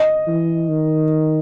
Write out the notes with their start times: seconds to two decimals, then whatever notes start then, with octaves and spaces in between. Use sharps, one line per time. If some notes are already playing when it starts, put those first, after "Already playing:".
Already playing: D#5
0.27 E3
0.69 D#3